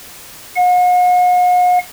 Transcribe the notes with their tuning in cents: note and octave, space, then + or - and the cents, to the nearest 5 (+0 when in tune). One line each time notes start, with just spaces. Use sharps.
F#5 -45